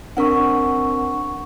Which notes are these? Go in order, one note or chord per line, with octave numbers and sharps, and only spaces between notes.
C4 D4 A#4 F#5 C#6